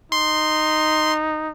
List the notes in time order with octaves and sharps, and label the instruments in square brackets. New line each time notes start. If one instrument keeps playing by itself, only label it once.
[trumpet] D#4 [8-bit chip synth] C6